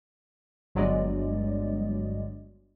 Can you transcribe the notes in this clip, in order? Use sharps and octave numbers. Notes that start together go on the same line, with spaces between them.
G1 G2 F#3 G#3 D5 D#5